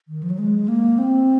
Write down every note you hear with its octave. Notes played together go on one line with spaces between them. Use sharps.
D#3
F3
F#3
G#3
A#3
C4